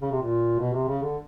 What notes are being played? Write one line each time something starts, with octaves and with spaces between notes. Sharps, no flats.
C#3
C3
A#2
B2
C3
C#3
D3